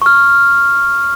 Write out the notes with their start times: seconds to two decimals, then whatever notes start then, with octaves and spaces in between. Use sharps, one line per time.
0.02 C#6 F6